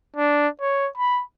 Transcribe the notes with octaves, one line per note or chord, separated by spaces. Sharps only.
D4
C#5
B5